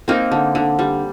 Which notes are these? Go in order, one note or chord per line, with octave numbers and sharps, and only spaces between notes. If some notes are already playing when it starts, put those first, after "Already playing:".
A#3 C4 D#4
D3
D3
G3